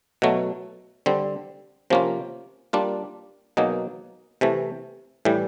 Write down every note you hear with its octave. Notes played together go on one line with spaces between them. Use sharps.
B2 F#3 A3
D3 G3 C4
C3 F3 A#3 C#4 F4
G3 A#3 D4 F4
B2 F#3 A#3 D#4 G#4
C3 E3 A3
A2 E3 G3